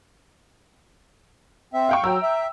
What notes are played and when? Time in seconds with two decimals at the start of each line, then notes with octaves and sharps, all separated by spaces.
1.74 C4 E5
1.89 F5 G5 C#6
2.04 F#3 G5 A#5 E6
2.22 E5